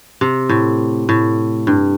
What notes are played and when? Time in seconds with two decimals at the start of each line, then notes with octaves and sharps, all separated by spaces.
0.21 C3
0.49 A2
1.09 A2
1.67 G2